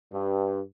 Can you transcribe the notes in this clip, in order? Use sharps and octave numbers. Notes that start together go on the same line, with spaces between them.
G2